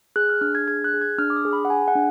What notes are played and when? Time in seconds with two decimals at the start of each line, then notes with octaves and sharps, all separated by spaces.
0.16 G#4 F#6
0.29 F6
0.41 D4 F6
0.55 G#6
0.68 G#4 G#6
0.84 F#6
0.94 G#4
1.01 G#6
1.18 D4 F6
1.30 D6
1.36 D#6
1.45 G#4
1.53 B5
1.65 F#5
1.70 G#4 G#5
1.88 F#5
1.95 D4